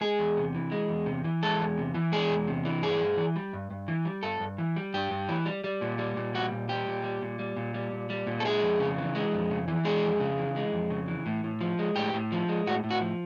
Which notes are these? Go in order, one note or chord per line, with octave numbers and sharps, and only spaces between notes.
G#3 G#4
E2
C3
E3
G#3
E2
C3
E3
G#3 A4
E2
C3
E3
G#3 G#4
E2
C3
E3
G2 G#4
G2
E3
G3
G2
G2
E3
G3
G2 A4
G2
E3
G3
G2 G4
G2
E3
G3
G3
A#2
G3
A#2
G3 F#4
A#2
G3 G4
A#2
G3
A#2
G3
A#2
G3
A#2
G3
A#2
A4
G#3 G#4
F2
C#3
E3
G#3
F2
C#3
E3
G#3 G#4
F2
C#3
E3
G#3
F2
C#3
E3
A2
A2
F3
G#3
A2 G4
A2
F3
G#3
A2 F#4
A2
F#4
F3